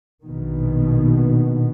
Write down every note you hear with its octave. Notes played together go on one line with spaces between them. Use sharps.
A#1 B2 D#3